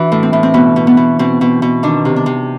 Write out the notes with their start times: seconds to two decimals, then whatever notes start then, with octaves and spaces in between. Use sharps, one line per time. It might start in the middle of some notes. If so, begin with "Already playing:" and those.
Already playing: E3 D4 E4 F#4
0.12 A2
0.23 C4
0.33 A2
0.43 C4
0.54 B2 B3
0.76 B2
0.87 B3
0.97 B2
1.19 B2 C4
1.41 B2
1.62 B2
1.83 D#3 D4
2.05 C3
2.16 D4
2.26 C3